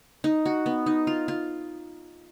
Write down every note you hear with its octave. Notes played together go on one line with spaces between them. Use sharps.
D#4
F#4
B3
D#4
F4
F4